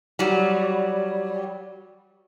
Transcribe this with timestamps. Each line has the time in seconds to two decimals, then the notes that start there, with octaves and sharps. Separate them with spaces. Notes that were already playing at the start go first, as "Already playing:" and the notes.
0.19 F#3 G3